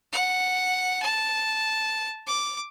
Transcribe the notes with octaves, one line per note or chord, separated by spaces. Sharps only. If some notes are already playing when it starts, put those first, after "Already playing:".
F#5
A5
D6